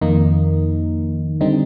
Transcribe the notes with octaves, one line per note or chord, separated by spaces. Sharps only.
F2 D#3 A#3 D#4
D3 G3 C4 D#4